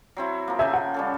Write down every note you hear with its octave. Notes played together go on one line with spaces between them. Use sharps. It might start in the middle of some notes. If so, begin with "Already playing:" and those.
F#3 C4 E4
F3 A#3
C#3 E5 G5 G#5
F#5
G3 C#4 A4